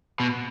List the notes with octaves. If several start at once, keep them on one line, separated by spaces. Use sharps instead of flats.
B2